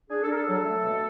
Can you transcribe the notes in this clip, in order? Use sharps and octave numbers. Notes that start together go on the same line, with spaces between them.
D4 G#4
A4
D4 A#4
A4
F#3
A3
B2